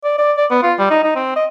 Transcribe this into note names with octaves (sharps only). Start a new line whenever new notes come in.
D5
D5
D5
B3
F4
G3
D#4
D#4
C4
D#5